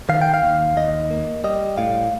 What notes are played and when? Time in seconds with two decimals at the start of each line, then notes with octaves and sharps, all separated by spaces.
0.09 D#3 F5
0.22 G5
0.34 F5
0.43 D#2
0.77 D#2 D#5
1.10 A#3
1.44 G3 D#5
1.77 A2 F5